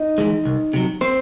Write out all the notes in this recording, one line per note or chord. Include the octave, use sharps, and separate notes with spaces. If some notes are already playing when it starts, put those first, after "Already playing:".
Already playing: D#4 D#5
E3 G#3
C2
C3 F#3
C4 C5